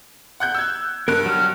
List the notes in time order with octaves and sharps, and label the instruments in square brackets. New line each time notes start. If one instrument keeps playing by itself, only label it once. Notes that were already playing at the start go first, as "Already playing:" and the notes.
[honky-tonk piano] F#5 F#6 G6
E6 G#6
[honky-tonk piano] G2 [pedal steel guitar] A#4 F#6
[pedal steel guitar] F#3 F6